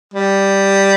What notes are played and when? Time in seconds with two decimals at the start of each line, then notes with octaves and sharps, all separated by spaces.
0.14 G3